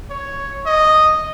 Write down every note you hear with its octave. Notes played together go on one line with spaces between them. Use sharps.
C#5
D#5